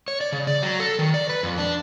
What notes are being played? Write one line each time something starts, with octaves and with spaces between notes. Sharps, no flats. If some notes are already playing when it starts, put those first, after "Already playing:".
C#5
D5
C#3
D5
F#3
A4
D#3
D5
B4
F2
D4